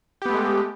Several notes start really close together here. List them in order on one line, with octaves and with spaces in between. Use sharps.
G4 B3 A3 G#3